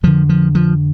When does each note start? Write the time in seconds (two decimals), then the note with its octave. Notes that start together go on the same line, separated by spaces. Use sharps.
0.03 F2 D3 F3
0.29 F3
0.55 F3